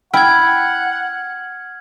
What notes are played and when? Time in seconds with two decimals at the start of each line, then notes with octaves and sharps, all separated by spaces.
0.14 E4 F#5 G5 F6 G#6